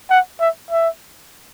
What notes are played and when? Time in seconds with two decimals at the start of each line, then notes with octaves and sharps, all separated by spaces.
0.10 F#5
0.40 E5
0.71 E5